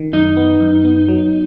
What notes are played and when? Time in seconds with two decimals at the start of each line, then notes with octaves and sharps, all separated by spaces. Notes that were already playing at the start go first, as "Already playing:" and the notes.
Already playing: D#3
0.13 F#2 D#4
0.37 B3
0.60 F#2
0.84 B3
1.09 F#3